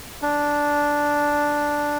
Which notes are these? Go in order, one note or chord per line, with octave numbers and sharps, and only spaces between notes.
D4